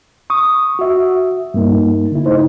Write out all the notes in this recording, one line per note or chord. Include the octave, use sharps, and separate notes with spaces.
C#6 D#6
F#4 E5
G2 A#3 D#4
D3 E4
C#3 A3 D#4 E4 C5